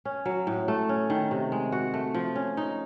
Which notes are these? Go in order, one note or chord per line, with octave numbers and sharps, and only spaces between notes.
C#4
F#3
A2
A3
C#4
D#3
C3
G#3
F#4
A3
F3
C#4
D#4